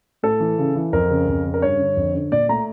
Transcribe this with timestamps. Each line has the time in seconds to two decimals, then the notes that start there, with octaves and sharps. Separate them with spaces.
0.23 A2 A4
0.40 E3
0.58 C#3
0.76 E3
0.93 F2 A#4
1.10 C#3
1.28 F2
1.45 C#3
1.54 A#4
1.62 G2 C#5
1.79 D3
1.97 F2
2.15 D3
2.32 A#2 D5
2.49 A3 A#5